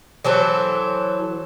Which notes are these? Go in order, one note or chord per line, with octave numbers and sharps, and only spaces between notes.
E3 F#3 A4 C5